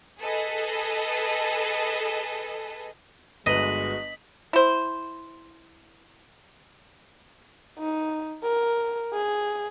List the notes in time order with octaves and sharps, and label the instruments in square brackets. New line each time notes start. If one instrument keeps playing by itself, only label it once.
[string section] G#4 A4 B4 D#5
[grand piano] G1 B4 [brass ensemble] G#3 F#4 [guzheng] D#5 [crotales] B6 F#7
[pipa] E4 C5
[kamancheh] D#4
A#4
G#4